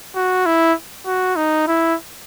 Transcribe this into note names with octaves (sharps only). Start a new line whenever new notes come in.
F#4
E4
F#4
D#4
E4